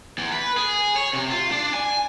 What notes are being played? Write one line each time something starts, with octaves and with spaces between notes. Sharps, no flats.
E2
B4
G#4
C#5
C3
F4
D4
G#5